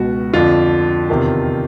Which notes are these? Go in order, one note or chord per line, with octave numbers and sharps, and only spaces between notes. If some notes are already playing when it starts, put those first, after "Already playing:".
Already playing: C#2 B2 F#4
F2 D3 F4
E2 C3 D#3